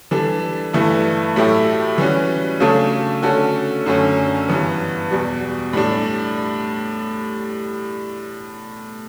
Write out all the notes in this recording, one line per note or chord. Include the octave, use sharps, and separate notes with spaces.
E3 G3 D4 A4
G2 E3 A3 E4
A2 F#3 A3 E4 G4
E3 G3 C#4 F#4
C#3 F#3 A3 D4 A4
D3 A3 C#4 F#4 A4
F#2 D3 A3 C#4
G2 E3 B3
E2 B2 G3
A2 G3 D4